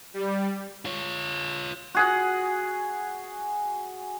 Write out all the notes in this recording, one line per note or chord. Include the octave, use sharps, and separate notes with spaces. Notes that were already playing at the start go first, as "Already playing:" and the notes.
G3
F4 C#5
F#4 G#4 F#5